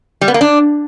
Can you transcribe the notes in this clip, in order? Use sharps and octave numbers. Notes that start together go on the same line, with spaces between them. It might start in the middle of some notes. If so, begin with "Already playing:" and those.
G3
B3
A#3
D4